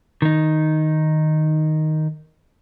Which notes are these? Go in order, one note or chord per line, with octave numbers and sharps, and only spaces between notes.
D#3 D#4